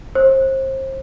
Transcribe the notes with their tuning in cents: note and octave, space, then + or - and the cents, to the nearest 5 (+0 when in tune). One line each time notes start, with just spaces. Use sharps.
C5 +30